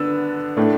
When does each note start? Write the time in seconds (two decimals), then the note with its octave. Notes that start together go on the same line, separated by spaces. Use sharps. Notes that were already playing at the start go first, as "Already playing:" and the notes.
Already playing: D3 B3 D4 E6 A6
0.57 A2 A3 D4